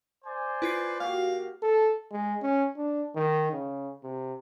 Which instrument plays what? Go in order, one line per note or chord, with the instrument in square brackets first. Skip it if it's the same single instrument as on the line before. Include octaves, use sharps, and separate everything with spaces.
[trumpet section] C5 D5 G#5
[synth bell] E4 F4 C7 [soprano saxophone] B4
[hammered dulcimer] A#2 F#4 G4 [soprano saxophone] F5
[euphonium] A4
G#3
C#4
D4
D#3
C#3
C3